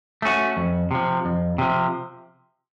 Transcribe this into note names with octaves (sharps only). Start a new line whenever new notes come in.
A3 C#4 F#4
F2
C3 F3
F2
C3 F3